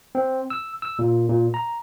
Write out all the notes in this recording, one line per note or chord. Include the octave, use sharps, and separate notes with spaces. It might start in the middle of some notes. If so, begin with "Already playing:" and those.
C4
E6
E6
A#2
A#2
A#5